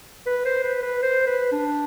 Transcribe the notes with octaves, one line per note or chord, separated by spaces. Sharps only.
B4
C5
B4
B4
C5
B4
D4